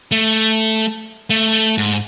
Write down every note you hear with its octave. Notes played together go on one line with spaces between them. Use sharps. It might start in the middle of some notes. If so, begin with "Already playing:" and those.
A3
A3
G#2